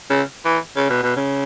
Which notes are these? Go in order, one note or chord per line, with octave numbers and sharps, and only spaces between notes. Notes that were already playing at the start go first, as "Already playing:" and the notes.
C#3
E3
C#3
B2
B2
C#3